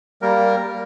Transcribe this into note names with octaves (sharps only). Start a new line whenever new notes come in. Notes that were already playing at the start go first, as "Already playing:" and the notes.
G3 A#3 A#4